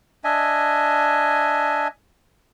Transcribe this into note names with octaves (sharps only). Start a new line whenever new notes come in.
D4 D#5 E5 G#5